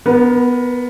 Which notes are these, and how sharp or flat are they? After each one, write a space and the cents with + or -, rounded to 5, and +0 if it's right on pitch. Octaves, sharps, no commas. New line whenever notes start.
B3 +0 A#4 +30